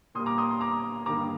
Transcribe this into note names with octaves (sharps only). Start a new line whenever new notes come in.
A#2 G3 A#3 C6 D#6
A#5 D6
C6 D#6
C6
A#5 D6
G2 D#3 G3 A#3 A#5 D6